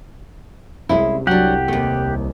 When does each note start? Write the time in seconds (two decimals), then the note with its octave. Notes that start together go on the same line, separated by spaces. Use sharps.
0.89 C2 G#3 C#4 E4
1.27 F#3 D4 G4 F#5
1.68 D#2 A3